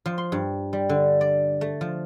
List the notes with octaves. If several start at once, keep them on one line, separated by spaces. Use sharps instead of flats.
F3
C6
G2
G3
D3
D5
A3
F3